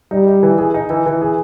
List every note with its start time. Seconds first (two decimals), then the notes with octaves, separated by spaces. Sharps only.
0.11 G3 D#4
0.27 D#4
0.43 E3
0.59 G#4
0.74 D#4
0.90 E3
1.06 E3
1.22 G#4